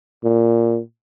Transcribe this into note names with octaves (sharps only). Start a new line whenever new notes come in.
A#2